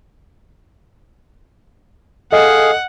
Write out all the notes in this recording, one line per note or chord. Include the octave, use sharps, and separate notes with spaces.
G#4 A4 D#5 F5 F#5